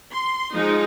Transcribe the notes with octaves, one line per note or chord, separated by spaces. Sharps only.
C6
F3 G#3 D#4